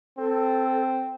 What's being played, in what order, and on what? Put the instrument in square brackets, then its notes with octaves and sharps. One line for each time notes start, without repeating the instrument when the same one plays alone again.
[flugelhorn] C4 [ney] A4